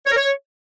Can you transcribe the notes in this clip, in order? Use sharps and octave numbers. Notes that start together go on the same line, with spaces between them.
C#5
A#4
C#5